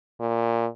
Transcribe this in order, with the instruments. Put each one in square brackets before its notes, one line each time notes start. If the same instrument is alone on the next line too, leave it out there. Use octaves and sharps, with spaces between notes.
[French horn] A#2